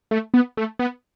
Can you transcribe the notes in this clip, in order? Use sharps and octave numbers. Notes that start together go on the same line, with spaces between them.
A3
B3
A3
B3